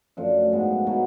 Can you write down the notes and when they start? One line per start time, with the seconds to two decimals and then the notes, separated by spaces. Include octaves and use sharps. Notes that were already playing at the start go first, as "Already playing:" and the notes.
0.17 F#2 F3 A3 D4
0.53 G#2 G#3 B3 F#4
0.87 B2 F#3 B3 F#4